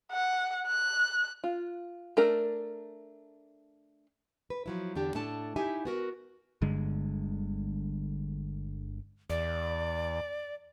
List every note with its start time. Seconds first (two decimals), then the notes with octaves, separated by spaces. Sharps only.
0.12 F#5
0.67 F#6
1.44 F4
2.17 A3 D4 A#4
4.50 B4
4.66 F3 F#3 E4
4.95 E2 D3 D4 G4
5.15 A2 A3 D4 A4 A5
5.56 D#4 E4 G4 E5 G#5
5.85 B3 F#4 A#4
6.62 G1 G2 D3 G#3
9.30 E2 D5